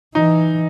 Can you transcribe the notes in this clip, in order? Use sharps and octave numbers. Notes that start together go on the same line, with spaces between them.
E3 D#4